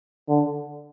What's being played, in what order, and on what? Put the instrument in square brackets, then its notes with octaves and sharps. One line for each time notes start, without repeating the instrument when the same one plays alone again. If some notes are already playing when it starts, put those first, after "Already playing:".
[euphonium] D3